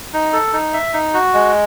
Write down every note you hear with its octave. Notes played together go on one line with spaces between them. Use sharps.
D#4
A4
D#4
E5
D#4
F#4
G#3